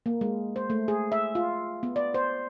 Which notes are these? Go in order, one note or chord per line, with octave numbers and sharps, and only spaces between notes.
A#3
G#3
C5
A3
G#4
E5
F4
B3
D5
C5